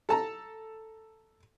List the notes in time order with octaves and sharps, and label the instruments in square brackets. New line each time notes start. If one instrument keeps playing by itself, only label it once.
[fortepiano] A4 A5 A#5